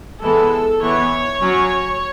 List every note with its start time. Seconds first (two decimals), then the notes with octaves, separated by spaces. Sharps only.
0.23 E3 G#3 B3 A4
0.82 E3 B3 C#5
1.41 F#3 C#4